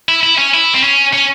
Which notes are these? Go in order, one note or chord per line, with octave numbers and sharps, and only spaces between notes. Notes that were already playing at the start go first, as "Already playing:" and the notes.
E4
E4
C#4
E4
C4
C#4
C#4